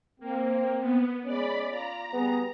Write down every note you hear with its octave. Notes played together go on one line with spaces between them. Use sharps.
A#3 C4
B3
G#3 C#4 D5 B5
F4 A#5
G3 B3 G#4